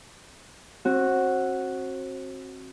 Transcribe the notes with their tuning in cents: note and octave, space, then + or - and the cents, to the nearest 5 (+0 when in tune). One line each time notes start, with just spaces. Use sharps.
C4 +35 F#4 +0